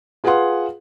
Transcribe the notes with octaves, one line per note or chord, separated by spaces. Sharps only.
F4 G#4 B4 F5 F#5 C6